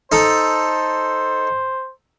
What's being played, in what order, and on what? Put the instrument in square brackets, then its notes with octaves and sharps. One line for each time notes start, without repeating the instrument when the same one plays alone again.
[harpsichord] D#4 A4 [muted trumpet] C5